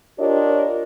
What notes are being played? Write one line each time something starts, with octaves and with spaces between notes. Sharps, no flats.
D4 F4 G4 A#4 C#5 D#5